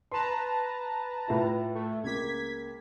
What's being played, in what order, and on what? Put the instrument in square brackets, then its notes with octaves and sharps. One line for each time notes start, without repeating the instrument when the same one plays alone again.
[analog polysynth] B4 A5 A#5 [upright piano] C6 E7
[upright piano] A2 E4 F4
[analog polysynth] A3
[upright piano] C#2 A#3 [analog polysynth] G#6 B6